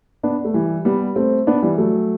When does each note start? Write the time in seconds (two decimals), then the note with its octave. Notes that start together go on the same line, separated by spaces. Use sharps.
0.23 B3 D4
0.45 A3
0.54 E3 G3
0.85 G3 B3
1.16 A3 C4
1.47 B3 D4
1.62 E3 G3
1.78 F#3 A3